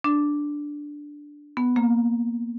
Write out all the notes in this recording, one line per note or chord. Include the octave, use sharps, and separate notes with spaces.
D4
B3
A#3